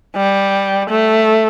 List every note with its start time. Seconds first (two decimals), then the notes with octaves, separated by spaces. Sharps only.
0.16 G3
0.90 A3